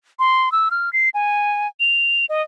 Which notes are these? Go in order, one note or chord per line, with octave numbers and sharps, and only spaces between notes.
C6
E6
F6
C7
G#5
F7
D#5